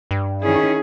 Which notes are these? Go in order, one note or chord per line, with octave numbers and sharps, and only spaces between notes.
G2
D#3 C#4 E4 G#4